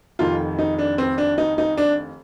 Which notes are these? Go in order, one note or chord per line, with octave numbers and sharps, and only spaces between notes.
F1 F2 D#3 F4
D#4
D4
C4
D4
D#4
D#4
D4